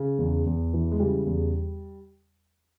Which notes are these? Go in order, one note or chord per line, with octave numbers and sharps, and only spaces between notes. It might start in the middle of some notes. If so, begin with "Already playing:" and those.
Already playing: C#3
E2
E2
E3
G#3
C#3 G3
E2